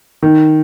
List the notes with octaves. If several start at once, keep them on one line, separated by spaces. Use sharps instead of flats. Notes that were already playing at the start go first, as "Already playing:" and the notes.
D#3